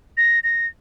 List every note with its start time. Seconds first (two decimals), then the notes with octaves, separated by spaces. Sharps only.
0.17 A#6
0.44 A#6